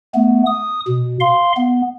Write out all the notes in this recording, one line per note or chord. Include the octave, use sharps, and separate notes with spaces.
A3 B3
D#6
B2
F5 C6
B3